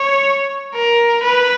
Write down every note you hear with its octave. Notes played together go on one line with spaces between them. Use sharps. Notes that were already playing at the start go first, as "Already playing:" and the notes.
Already playing: C#5
A#4
B4